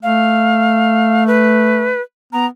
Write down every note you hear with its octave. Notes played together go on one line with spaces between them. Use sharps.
A3 F5
B4
B3 A#5